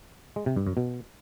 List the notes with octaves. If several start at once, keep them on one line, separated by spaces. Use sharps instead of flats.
G#3
C3
G2
F#2
B2